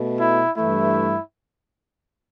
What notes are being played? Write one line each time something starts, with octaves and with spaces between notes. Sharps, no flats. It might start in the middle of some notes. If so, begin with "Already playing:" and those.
Already playing: B2 A3
E4
G2 E3 A3 E4